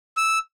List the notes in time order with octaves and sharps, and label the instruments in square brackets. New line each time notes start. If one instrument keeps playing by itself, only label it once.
[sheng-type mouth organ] E6